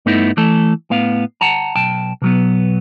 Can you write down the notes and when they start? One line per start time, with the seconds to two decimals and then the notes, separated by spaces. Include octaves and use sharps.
0.06 G2 A3 B3 D#4 E4
0.37 E3 A3 A4
0.90 A2 B3 F5
1.41 F#5 A5 A#5
1.76 B1 G5 A5
2.22 B2 F#3 B3